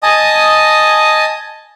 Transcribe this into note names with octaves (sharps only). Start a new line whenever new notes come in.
D#5 G#5 A5 D#6